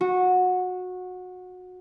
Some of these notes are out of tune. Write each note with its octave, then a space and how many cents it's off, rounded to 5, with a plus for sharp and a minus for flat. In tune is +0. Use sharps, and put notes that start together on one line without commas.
F#4 -20